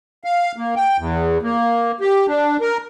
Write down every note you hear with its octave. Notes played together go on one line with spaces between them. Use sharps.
F5
A#3
G5
E2
A#3
G4
D4
A#4